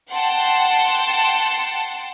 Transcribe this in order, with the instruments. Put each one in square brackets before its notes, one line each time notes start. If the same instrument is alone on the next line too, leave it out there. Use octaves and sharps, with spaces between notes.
[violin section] F#5 G5 A5 C6